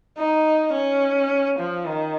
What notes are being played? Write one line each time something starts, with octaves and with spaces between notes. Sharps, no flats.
D#4
C#4
F3
D#3